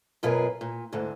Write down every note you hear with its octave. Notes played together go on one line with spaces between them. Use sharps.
F#2 B2 F4 G#4 A#4 B4
A#2
D2 G#2 D3